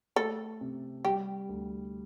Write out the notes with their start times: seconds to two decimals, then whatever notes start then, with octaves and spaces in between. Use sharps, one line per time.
0.16 A3 A4
0.61 C3
1.05 G3 G4
1.49 D2